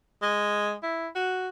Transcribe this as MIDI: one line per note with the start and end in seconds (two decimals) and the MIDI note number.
0.22 0.74 56
0.83 1.08 64
1.15 1.48 66